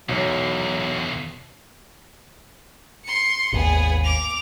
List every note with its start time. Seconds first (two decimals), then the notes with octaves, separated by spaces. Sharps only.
0.09 B1 E2 B2 F#3
3.04 C6 C#7
3.53 G#1 D#2 B3 G#4
4.04 D6 F7